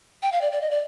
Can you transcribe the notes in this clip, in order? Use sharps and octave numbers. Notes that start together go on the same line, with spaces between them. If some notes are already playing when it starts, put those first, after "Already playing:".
G5
F5
D5
D5
D#5
D5